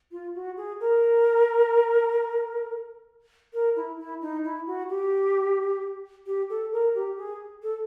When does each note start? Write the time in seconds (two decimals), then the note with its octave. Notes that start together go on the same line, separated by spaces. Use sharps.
0.12 F4
0.35 F#4
0.57 G#4
0.80 A#4
3.53 A#4
3.76 E4
3.98 E4
4.21 D#4
4.44 E4
4.67 F#4
4.89 G4
6.27 G4
6.50 A4
6.72 A#4
6.95 G4
7.17 G#4
7.63 A4